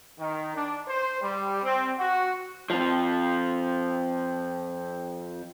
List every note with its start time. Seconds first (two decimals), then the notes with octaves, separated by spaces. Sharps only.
0.19 D#3
0.54 D4
0.87 C5
1.22 G3
1.62 C4
1.98 F#4
2.70 F2 F3